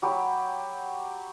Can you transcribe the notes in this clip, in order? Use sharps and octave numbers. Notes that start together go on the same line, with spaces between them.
F#3 G4 B5